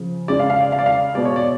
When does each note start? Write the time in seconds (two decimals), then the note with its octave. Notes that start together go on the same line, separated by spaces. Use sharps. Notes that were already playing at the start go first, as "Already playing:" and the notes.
Already playing: C#3 F3
0.28 C#3 G#3 D5
0.39 F5
0.50 F5
0.61 D5
0.72 F5
0.79 D5
0.86 F5
1.15 B2 G#3 D5
1.25 C#5
1.36 D5